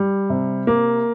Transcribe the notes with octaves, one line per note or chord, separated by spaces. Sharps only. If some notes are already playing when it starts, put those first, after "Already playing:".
Already playing: G3
C3
A#3